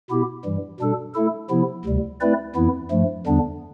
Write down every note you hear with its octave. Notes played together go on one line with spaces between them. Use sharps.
B2 B3 E4 G4
G2 E3 G3
B2 G3 D4 A4
A3 E4 A4
C3 F3 B3 E4
D2 C3 G3
A3 C4 E4 B4 D5
F2 E3 B3 E4
G2 F3 A3
E2 D3 G3 B3 D4